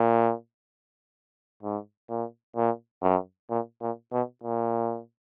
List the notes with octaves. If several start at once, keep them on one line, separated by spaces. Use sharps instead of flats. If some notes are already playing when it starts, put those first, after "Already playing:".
Already playing: A#2
G#2
A#2
A#2
F#2
A#2
A#2
B2
A#2